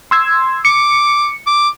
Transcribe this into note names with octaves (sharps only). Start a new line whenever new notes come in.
C6 E6 G#6
D6 C#7
D6